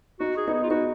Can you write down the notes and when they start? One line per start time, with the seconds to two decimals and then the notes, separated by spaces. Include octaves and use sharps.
0.20 D#4 F#4
0.37 G#4
0.48 B3 D#4
0.54 G#4
0.63 F4
0.70 B3 D#4 F#4